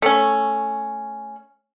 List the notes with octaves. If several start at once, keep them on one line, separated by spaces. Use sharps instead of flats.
A3 C#4